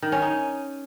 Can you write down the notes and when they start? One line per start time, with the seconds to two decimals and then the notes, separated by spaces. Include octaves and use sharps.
0.02 D#3
0.12 C#4
0.22 D#4